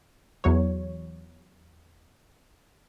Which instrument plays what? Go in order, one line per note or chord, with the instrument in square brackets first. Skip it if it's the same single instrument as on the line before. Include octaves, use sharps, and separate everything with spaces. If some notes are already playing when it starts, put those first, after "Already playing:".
[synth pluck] E2 F#3 C#5